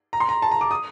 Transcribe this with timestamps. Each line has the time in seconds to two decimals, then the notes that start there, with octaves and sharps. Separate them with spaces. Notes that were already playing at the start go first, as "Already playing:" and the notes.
0.13 A#5
0.20 C6
0.29 A#5
0.42 A5
0.51 A#5
0.61 D6
0.71 D#6